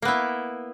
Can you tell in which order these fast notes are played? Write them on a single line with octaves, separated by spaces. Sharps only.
A#3 B3 E4